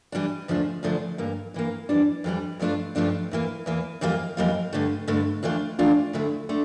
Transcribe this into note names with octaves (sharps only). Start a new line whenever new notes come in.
E3 G3 D4
E2 D3 F3 A3 D4
E2 D3 F3 A3 D4
G2 E3 A#3
G2 E3 A#3
F2 E3 G3 D4
F2 E3 G3 D4
G2 F3 A3 D4 F4
G2 F3 A3 D4 F4
E2 E3 A#3
E2 E3 A#3
F2 E3 G3 A#3 F4
F2 E3 G3 A#3 F4
G2 D3 A3
G2 D3 A3
F2 E3 A3 D4 F4
F2 E3 A3 D4 F4
D2 D3 A3 E4
D3 A3